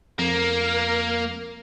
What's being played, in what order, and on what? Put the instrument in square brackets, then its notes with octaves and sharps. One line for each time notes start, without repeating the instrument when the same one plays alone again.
[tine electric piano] F2 [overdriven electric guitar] A#3 [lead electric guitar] A#4